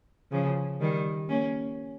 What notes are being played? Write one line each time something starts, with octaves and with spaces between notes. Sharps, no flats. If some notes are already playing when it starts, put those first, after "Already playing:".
C#3 F3
D#3 G3
A#3 C#4